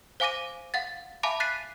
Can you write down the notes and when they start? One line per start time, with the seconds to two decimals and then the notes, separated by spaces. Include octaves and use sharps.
0.20 C5 F5 G#5 D6 A#6 D#7
0.74 F5 F#5 A6
1.23 E5 F5 G#5 A5 B5 D6
1.40 F#6 A6 B6 C7 D#7